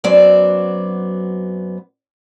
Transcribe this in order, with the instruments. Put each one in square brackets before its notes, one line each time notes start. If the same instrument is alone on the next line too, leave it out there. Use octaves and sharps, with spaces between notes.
[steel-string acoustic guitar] F#2 F#3 B3 C4 D5